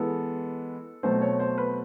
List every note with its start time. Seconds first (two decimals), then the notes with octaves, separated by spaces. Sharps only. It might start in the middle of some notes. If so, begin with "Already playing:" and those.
Already playing: E3 G#3 B3 A4
1.03 B2 F#3 A3 C4 C5
1.22 C#5
1.39 C5
1.58 B4